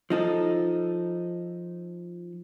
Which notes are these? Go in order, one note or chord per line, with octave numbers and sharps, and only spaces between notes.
F3 D#4 A4